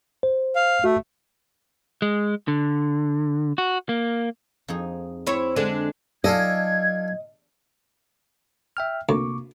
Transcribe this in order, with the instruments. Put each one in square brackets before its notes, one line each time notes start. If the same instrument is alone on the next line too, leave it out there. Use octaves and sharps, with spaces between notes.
[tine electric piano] C5
[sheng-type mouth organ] F5
[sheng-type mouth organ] A3 [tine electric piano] F#4
[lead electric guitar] G#3
D3
F#4
A#3
[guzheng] F2 D#4 G#4
[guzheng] C4 [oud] E4 C#5
[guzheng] D3 [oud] G#3 D4 A4
[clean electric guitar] F#3 D#4 G#5 [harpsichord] F4 A4 D5 [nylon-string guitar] D#5 [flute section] G#6
[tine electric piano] E5 G5 F6
[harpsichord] D2 [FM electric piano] C3 A#3 [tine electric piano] C#6 D6